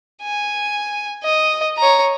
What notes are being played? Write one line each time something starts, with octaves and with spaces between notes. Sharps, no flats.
G#5
D#5
C#5 A#5